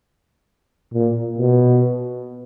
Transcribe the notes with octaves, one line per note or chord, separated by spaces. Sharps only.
A#2
B2